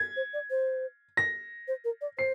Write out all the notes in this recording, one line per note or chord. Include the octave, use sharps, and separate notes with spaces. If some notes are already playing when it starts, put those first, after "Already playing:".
Already playing: G#6
C5
D5
C5
A#6
C5
A#4
D5
C5 C7